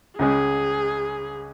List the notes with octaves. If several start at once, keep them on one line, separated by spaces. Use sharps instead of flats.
C#2 C#3 G#3 G#4